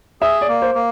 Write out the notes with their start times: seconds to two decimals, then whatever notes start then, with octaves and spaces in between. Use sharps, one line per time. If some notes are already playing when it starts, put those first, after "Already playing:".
0.21 G#4 E5
0.41 D5
0.48 A#3
0.62 C5
0.75 A#3